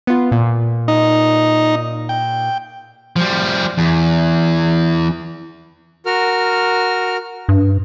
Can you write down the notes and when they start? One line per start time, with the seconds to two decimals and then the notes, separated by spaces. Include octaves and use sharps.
0.07 B3 F4
0.32 A#2
0.88 D#4
2.09 G5
3.16 F3 G3
3.78 E2
6.06 F#4 A#4 F6
7.49 G2